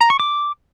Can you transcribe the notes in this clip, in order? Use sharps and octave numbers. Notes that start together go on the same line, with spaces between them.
A#5
C#6
D6